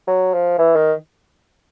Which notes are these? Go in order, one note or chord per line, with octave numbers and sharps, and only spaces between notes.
F#3
F3
E3
D#3